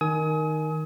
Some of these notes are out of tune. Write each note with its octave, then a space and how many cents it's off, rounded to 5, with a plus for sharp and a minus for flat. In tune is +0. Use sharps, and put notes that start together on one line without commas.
D#3 +0 G#5 +20 D#6 +35